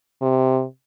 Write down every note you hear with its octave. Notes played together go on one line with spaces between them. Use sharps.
C3